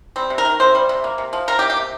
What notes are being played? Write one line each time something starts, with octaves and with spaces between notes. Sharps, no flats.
G3 C4
C3
A#4
D#3
C3 C5
G3
C3
A#3
C3
F3
C3 A#4
G4
A#3
G4
C3